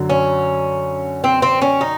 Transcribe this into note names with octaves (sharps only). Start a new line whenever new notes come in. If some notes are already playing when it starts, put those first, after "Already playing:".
Already playing: F#2 D3 F#3
C#4
C4
C4
C#4
D#4